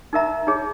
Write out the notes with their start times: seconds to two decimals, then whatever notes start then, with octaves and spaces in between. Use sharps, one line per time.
0.13 D#4 A#4 E5 A#5
0.47 D#4 G#4 C#5